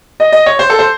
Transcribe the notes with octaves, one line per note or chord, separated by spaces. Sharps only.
D#5
D#5
C#5
C5
A4
C5